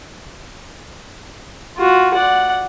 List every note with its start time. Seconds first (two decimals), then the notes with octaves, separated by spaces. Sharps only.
1.78 F4 F#4
2.14 D5 F#5